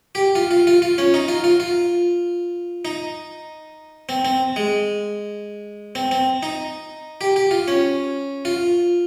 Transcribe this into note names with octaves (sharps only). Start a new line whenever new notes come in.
G4
F4
F4
F4
F4
C#4
D#4
F4
F4
F4
D#4
C4
C4
G#3
C4
C4
D#4
G4
G4
F4
C#4
F4